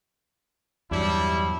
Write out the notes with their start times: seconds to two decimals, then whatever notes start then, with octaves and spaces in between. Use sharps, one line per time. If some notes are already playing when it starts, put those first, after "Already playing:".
0.91 E2 G2 F#3 G3 D4 E4